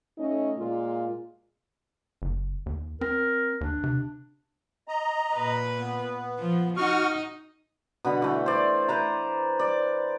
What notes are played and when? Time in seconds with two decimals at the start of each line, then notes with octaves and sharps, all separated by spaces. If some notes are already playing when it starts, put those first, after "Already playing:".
0.18 A3 C#4 D#4 D#5
0.58 A#2 G#3 F4
2.22 F#1
2.66 D#2
3.01 C4 A#4
3.61 D#2 D4
3.84 C3
4.88 D#5 A#5
5.34 A#2 B4
5.79 B3
6.38 F3
6.77 D#4 F#4 C#6 F6
8.05 B2 D3 B5
8.22 E3 A3
8.46 C5 D5
8.88 B4 C5 A#5
9.59 D5